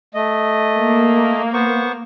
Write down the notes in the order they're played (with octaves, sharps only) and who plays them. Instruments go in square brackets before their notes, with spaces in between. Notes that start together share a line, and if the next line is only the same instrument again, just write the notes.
[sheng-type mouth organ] A3 D#5
[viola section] A#3
[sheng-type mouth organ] B3 C5 C#6